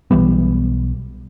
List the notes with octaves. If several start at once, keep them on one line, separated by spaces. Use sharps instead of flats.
B1 E3 G3 B3